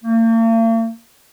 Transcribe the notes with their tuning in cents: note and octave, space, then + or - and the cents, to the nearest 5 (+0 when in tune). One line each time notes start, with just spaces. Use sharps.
A#3 -45